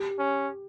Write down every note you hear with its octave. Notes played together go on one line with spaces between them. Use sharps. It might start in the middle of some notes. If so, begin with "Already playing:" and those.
Already playing: G4
C#4